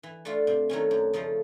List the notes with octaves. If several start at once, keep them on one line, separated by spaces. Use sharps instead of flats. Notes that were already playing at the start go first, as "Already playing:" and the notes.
E3
A3 D4 F4
C3
D#3 F#3 A3 C#4
F#2
C#3 F3 A3